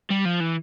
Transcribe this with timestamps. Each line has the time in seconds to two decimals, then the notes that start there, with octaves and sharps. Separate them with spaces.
0.10 G3
0.25 F3
0.40 E3